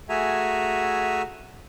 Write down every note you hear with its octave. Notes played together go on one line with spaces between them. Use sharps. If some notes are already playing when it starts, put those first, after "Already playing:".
A3 F#4 G#4 E5 G#5 A#5